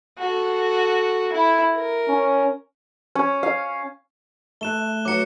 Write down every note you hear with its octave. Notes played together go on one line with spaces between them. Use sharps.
F#4 A4
E4
A#4
C#4
C#4
F5
A3 F#6 E7 G7
F#3 D6 C#7